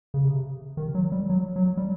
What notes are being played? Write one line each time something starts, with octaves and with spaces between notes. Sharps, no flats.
C#3
C3
D#3
F#3
G3
F#3
F#3
G3